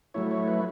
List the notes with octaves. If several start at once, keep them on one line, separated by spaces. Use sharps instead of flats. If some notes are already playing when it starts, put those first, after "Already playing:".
F#3 A3 E4 C#5
C#5
B4